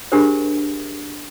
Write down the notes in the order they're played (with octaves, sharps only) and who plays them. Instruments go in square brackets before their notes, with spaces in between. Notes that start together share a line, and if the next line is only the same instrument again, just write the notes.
[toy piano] D4 G4 G#4 A#4 C5